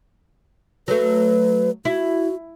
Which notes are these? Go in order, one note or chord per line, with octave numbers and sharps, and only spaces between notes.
F#3 A3 B4
E4 F#4